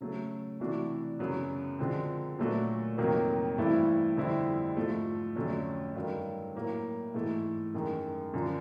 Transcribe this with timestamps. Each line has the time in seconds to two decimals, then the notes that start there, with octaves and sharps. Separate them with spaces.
0.01 C#3 F#3 A3
0.60 C3 E3 A3 D4 F#4
1.19 F#2 C#3 F#3 B3
1.79 D3 F3 G#3 C4
2.38 A#2 F#3 A3 D4 F#4
2.98 F2 C3 D#3 F#3 A#3
3.58 G2 E3 A3 C4 E4
4.17 F2 D3 G3 C4 E4
4.77 G#2 F3 A3
5.36 F2 D3 F#3 A3 C#4
5.95 G2 D#3 F#3
6.55 A2 F#3 A#3
7.14 G#2 E3 A3
7.74 F#2 D#3 G#3
8.34 F#2 D3 F3